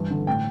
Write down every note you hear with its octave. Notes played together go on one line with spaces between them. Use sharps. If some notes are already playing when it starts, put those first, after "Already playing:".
Already playing: G2 E3
D3
A2 G5